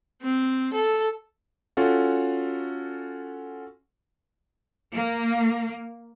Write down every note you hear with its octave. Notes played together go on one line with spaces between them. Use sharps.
C4
A4
C#4 F4 F#4 A4
A#3